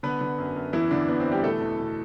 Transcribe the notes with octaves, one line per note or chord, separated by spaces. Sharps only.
D3 B3 B4
D3
F#2
F#2
E2 E3 E4
E2 D3 D4
E2 B3
C4
E3
G3 G4
B2 A3 A4
E2
B2